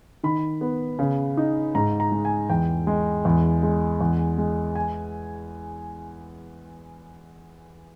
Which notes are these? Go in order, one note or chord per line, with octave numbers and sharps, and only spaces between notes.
D#3 B5
B3
C#3
D#4
G#2 A#5
A#5
G#3
G#5
E2 G5
G#3
E2
G#3
E2
G#3
G#5